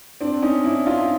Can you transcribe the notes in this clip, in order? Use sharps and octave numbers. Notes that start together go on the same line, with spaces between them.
C4 D4
C#4 D#4
D4 E4
D#4 F4